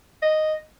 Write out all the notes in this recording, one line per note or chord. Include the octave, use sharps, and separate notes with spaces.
D#5